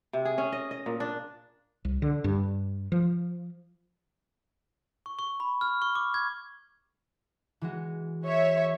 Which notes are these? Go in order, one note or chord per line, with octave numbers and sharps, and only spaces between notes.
C3
G#4
C#4
D#5
D#5
A#2
D4
C2
D3
G2
F3
C#6
C#6
B5
F6
C#6
D6
G#6
E3 G#3 F#4
C#5 E5